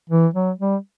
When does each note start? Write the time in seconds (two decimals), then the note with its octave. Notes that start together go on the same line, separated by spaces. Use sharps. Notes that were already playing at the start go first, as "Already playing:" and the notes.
0.10 E3
0.34 F#3
0.59 G3